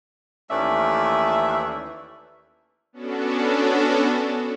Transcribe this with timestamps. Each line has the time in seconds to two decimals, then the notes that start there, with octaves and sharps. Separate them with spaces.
0.50 D#2 E3 A3 C#4 D5 E5
2.93 B3 C#4 D4 F#4 A4